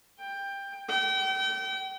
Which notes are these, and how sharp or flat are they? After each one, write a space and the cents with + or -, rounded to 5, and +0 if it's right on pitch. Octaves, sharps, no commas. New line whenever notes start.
G5 +15
G5 -35